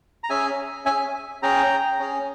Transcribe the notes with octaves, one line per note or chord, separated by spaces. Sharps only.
A#5
C#4 G#4 E5 G#5
C#4 E5 G#5
G#4
C#4 G#4 G5 A#5
C#4 G#4